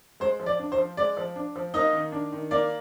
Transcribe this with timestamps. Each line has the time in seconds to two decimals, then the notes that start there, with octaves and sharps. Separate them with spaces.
0.20 G#3 C5
0.39 F3
0.46 D5
0.59 D4
0.72 C5
0.78 F3
0.97 G#3 D5
1.17 F3
1.36 D4
1.56 F3
1.74 A#3 D#4 D#5
1.93 D#3
2.12 D4
2.32 D#3
2.51 A#3 D5